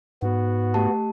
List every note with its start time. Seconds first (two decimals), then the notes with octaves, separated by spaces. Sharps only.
0.22 G#2 B3 F#4
0.74 A3 G4 A5